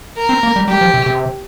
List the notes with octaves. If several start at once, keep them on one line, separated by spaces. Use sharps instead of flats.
A#4
C4
A#3
G3
G3 G4
F3
C3
C3